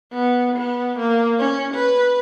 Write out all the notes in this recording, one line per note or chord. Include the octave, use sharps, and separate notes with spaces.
B3
B3
A#3
C#4
B4